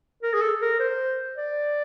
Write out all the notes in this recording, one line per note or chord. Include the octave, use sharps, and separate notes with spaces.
A#4
G#4
A4
A#4
C5
D5